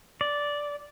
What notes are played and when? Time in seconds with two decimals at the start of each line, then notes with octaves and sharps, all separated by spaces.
0.21 D5